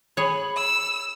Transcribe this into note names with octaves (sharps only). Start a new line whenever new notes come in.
G#4 C#5 B5
E6